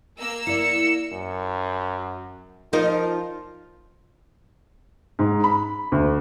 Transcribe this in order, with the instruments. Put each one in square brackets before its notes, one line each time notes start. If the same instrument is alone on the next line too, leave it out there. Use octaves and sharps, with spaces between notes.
[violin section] A#3 E6
[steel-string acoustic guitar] E4 D5 [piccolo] C#7
[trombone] F#2
[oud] F3 D#4 A#4 [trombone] F4
[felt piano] G#2
B5
D2